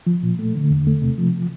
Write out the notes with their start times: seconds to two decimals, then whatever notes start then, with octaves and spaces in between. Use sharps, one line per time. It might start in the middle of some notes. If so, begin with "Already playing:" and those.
0.07 F3
0.23 A#2
0.39 A3
0.55 D3
0.71 E2
0.87 A3
1.02 C3
1.18 F3